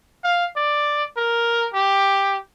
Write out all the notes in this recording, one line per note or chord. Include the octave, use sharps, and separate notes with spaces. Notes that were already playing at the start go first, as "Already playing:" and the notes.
F5
D5
A#4
G4